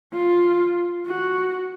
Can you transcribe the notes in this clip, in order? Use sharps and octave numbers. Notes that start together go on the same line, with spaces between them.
F4
F#4